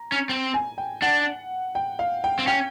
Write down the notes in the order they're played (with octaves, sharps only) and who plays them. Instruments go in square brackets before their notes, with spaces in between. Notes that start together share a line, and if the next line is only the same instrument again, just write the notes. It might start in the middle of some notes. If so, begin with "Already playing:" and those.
Already playing: [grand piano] A#5
[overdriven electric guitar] C#4
C4
[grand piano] G#5
G5
[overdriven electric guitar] D4 [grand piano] F#5
[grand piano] G5
F5
G5
[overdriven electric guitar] C4
[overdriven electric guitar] C#4 [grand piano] G5